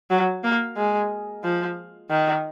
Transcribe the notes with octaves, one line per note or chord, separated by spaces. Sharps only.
F#3
A#3
G#3
F3
D#3